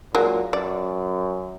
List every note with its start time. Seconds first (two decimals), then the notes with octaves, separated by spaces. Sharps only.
0.15 A#2 F#3 G#3 A#3
0.53 F#2 D5